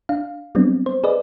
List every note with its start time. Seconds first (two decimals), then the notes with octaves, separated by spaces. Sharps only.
0.09 D4 F5
0.55 F#3 G3 B3 C4 D4
0.86 C5
1.04 G#4 B4 D5 D#5